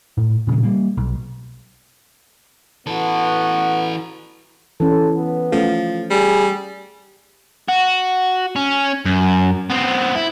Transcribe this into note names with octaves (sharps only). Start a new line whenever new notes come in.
A2
A#2 C#3 F3 G#3
G3 A#3
B1
E3 B3 F#4 A4
E3 C#4 A4
B3
F3 A3 C#4 A4
G3 G#4
F#4
C#4
F#2
B3 C4
E4